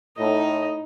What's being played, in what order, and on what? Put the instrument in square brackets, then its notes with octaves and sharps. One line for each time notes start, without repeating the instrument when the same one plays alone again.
[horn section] A2 [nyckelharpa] D#4 D#5